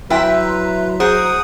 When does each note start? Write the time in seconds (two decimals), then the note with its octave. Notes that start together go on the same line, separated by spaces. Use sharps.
0.10 F#3 E4 B4 E5 G5 A#5 C6
1.00 G#4 C5 F#5 A#5 D#6 D7